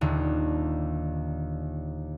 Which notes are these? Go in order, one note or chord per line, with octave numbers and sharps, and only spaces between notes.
D#1 D#2 D3